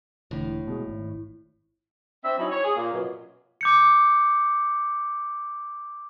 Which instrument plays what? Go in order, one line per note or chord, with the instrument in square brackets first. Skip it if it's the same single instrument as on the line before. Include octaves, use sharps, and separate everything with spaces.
[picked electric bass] E1 D3 [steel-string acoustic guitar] A2
[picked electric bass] B2 G#3
G#1
[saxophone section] C4 D4 E5
F#3 C#4 D#4 E4
C#5
G#4
A#2 A#3
F#2 B2
[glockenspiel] D6 G6 C#7